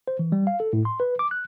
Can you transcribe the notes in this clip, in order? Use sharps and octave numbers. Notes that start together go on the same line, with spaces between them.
C5
E3
G3
F5
A4
A2
C6
B4
D6
F#6